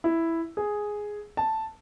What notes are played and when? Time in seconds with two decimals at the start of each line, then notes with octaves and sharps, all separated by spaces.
0.04 E4
0.57 G#4
1.37 A5